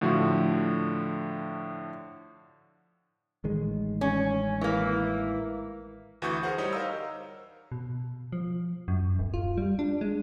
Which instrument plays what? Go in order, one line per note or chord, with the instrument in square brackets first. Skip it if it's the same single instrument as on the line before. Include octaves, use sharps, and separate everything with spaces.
[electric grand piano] A2 D3 F3 F#4
[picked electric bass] A1 D#3 G#3
[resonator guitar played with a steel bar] C#4
E3 A#3
[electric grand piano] D2 E3 F#4 C#6 D#6 G6
G#4 A#4 C5 F#5
G3 D#4 C5 C#5 D#6
A#4 C5 D#5 F5 A#5 E6
[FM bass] B2
F3
F#2
D1
F4
G3
D4
G#3